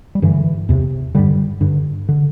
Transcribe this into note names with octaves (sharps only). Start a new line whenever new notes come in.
G3
G2 D3 E3
E2 C3
G2 D3 G3
G2 D3
D3